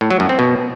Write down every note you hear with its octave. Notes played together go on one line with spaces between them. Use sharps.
A2
F#3
F#2
C4
B2